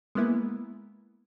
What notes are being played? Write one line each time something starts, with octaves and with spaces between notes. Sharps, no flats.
G#3 A#3 B3 E4